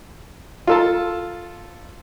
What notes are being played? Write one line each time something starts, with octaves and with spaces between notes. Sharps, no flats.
F4 A4 A5